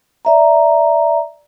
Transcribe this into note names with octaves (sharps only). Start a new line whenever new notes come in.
D5 E5 A#5